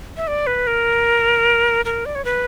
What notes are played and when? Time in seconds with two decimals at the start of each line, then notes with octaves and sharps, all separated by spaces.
0.17 E5
0.27 D5
0.47 B4
0.67 A#4
1.85 A#4
2.06 D5
2.15 C#5
2.25 B4